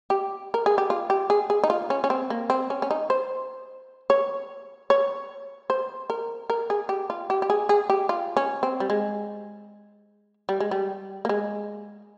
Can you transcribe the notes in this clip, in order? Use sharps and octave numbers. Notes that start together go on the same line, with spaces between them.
G4
A#4
G#4
G4
F4
G4
G#4
G#4
D#4
F4
C#4
C#4
C4
A#3
C4
C#4
C#4
D#4
C5
C#5
C#5
C5
A#4
A#4
G#4
G4
F4
G4
G4
G#4
G#4
G4
F4
C#4
C4
G3
G#3
G3
G#3
G3
A#3
G#3